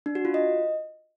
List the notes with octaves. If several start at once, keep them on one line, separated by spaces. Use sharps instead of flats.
D4
F#4
F4
D#5